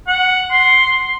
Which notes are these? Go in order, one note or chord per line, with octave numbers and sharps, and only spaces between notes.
F#5
C6